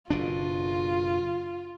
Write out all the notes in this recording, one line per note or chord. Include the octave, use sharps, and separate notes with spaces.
F#1 B2 D4 F4